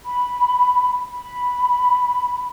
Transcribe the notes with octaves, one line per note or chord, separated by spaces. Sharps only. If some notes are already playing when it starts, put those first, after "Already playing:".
B5
B5